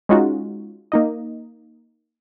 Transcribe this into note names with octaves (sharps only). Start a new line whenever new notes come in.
G#3 C#4 D#4 F4 F#4
A#3 D#4 D#5